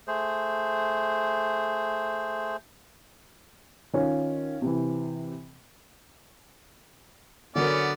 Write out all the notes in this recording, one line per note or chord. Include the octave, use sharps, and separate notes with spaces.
A3 G#4 C5
D#3 C#4 F4
C3 E3
D3 F#3 B3 C#4 A#4 D5